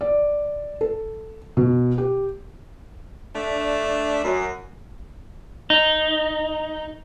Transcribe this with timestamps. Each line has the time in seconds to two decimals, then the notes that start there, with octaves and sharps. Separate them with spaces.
0.01 D5
0.81 A4
1.57 B2
1.98 G4
3.34 A3 D4
4.24 F#2
5.70 D#4